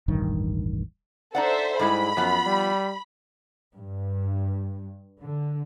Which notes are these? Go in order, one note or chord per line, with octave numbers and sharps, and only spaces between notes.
E1 A1 G2 D#3
D#4 A4 C5 D5 E5 F#5
G#2 G3 G#3 E4 B5
F#2 F3 B3 F4
G3
G2
D3